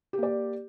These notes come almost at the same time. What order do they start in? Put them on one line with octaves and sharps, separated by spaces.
G4 A#3 D5